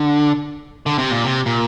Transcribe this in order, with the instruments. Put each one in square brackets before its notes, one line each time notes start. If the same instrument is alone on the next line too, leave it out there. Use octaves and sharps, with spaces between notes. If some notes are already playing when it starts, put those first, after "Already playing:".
Already playing: [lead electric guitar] D3
D3
C3
A#2
C3
A#2